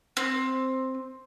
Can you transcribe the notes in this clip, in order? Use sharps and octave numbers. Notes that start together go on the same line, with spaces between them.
C4